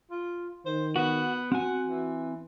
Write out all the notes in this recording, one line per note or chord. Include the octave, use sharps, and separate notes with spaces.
F4
D#3 C5
B3 F#4
C4 F#4 F#5 G#5
E3